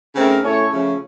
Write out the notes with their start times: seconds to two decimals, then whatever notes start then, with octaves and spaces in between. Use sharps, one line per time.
0.15 C#3 A3 C4 D#4 A#4
0.43 A2 A3 C#4 A4 C#5
0.71 C#3 F3 A3 C#4